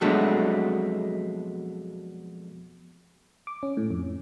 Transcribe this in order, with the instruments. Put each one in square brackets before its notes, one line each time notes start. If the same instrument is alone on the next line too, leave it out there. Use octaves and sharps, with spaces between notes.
[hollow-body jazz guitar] F2 B2 F#3 G#3 A3 D4
[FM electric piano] D6
C#4
A2
F2